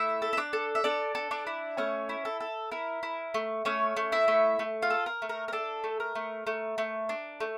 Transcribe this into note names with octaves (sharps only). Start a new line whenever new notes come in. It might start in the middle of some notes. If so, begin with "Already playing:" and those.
Already playing: A3 E4 E5
A4
E5
D4 D5
A4
E5
D4 A4 D5
A4
D4 D5
E4
A3 C#4 C#5
E4
A4
A4
E4 A#4
E4
A3
A3 C#4 C#5
A3
E4 E5
A3
A3
F4 F5
A4
A#4
A3
A#4
A#4
D4 A4
A3
A#4
A3
A3
A3
D4
A3